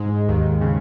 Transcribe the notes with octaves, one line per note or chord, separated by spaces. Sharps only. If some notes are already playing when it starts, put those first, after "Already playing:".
Already playing: G#2 G#3
D#2 D#3
C#3